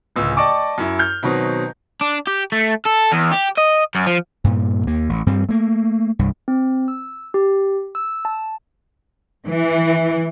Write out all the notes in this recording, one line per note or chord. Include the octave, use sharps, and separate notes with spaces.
D1 C#2 E6
D5 D#5 G5 A5 C#6 D6
F#2 E4
F6 G6
B2 D#3 F#3 C4
D4
G4
A3
A4
E2
G4
D#5
F#2
F3
G2 A#2
D#2 A#3
A1
G2 G3 C4
A3 A#3
C2 G2
C4
E6
G4
E6
A5
E3